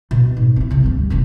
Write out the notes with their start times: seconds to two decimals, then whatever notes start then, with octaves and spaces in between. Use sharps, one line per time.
0.11 B2 D#3
0.37 G#2
0.56 C#4 E4
0.70 C2 C3
0.84 D2 G2
1.10 F1 B1